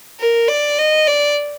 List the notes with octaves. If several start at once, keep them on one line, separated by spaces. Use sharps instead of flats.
A#4
D5
D#5
D5